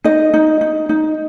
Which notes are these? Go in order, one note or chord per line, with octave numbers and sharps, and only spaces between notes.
D#4 D#5
D#4
D#4
D#4